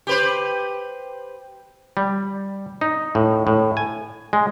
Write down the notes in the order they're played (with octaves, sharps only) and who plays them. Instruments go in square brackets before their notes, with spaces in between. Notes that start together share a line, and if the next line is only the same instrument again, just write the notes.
[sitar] G4 B4 C5
[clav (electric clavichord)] G3
D#4
A2
A2
G#5
G#3